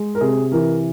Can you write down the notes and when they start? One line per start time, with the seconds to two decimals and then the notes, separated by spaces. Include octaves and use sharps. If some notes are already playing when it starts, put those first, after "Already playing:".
Already playing: G#3
0.15 A#4
0.21 C3 G#4
0.52 E3 A#4